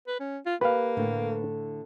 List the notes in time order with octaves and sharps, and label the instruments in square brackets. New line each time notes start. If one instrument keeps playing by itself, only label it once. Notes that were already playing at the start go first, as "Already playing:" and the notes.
[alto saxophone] B4
C#4
F4
[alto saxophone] A#3 [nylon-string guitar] G4 [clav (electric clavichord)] B4 F5
[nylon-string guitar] A2 D3 A3